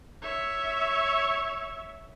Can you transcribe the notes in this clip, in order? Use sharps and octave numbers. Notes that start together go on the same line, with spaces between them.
C#5 E5